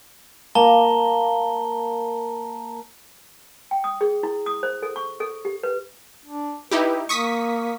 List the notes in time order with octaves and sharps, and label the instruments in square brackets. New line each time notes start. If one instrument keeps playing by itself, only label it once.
[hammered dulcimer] A#3 [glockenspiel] A5 A#5 G7
[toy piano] G5
D#6
G#4
E4
D#6
C5
A4
C#6
A4
G4
B4
[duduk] D4
[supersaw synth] D#4 E4 G4 [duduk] B4
[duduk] A#3 [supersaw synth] C#6 D#6 B6